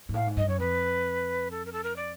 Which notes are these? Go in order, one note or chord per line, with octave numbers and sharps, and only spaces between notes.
G#2
A2 F5
G#2
G2 D#5
F#2 C#5
F2 B4
A4
A#4
A4
A#4
D5